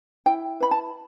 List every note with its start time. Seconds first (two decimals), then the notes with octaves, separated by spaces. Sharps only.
0.26 E4 G5
0.60 B4 B5
0.71 A5